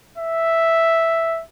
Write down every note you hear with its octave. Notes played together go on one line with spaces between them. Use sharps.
E5